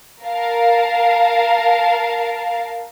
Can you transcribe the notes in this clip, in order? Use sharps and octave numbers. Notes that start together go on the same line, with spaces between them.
A#4 F5 A5